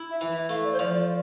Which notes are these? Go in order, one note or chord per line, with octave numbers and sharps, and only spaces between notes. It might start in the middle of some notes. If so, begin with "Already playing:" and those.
Already playing: E4
E5
E3
E5
A3 F5
D5
C5
F3 D5
D5